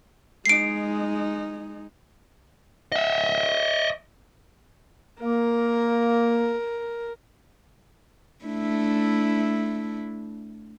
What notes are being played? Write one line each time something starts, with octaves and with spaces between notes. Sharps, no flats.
G#3 D#4 C7 D7
D#5 E5
A#3 A#4
A3 D4 E4